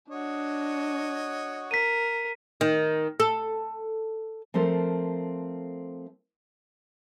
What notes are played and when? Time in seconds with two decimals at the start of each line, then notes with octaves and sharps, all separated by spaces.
0.10 D4 F#4 C#5 D#5
1.71 A#4 B6 D#7
2.61 D#3
3.20 A4
4.54 F3 A3 C4 A4 A#4